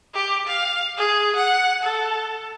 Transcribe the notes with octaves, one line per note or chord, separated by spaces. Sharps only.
G4
F5
G#4
F#5
A4